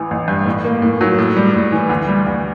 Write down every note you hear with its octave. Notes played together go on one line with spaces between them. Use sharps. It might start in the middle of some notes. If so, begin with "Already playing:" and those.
Already playing: A1 E3
A1
G2
A2
A#3
A2
F#3
A2
G3
A2
E3
D2
G3
D2